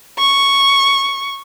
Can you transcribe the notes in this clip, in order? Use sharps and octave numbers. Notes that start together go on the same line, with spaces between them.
C#6